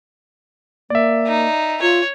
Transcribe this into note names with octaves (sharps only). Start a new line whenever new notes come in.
A#3 D5 E5
D#4
F4 C#5